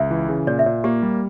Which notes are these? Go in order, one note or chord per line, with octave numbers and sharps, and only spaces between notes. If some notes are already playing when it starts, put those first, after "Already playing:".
Already playing: C#2 E5
E3
C#3
A#2 D5
E5
A#2 D5
A#3 G4
G3